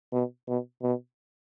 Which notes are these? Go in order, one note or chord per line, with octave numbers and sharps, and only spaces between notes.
B2
B2
B2